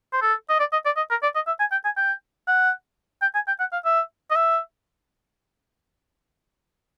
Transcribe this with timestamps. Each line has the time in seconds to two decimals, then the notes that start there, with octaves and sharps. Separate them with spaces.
0.13 C5
0.22 A4
0.49 D#5
0.59 D5
0.73 D#5
0.85 D5
0.97 D#5
1.10 A#4
1.23 D5
1.35 D#5
1.47 E5
1.59 G#5
1.72 G5
1.85 G#5
1.97 G5
2.47 F#5
3.22 G5
3.34 G#5
3.48 G5
3.60 F#5
3.73 F5
3.85 E5
4.30 D#5
4.35 E5